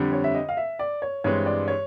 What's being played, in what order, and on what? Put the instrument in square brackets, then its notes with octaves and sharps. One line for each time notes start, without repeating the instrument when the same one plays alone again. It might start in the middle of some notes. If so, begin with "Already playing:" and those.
Already playing: [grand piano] F2 D3 G3
[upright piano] C#5
E5
D#5
F5
E5
D5
C#5
[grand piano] G2 E3 G#3 C4 [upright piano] C#5
[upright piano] D5
C#5